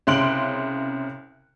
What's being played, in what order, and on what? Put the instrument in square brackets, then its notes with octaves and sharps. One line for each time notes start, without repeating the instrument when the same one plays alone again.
[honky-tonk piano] C2 C#3 C6 F#6 D7 F#7